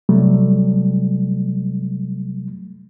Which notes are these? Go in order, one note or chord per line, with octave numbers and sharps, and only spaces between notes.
C3 F#3 G3 A3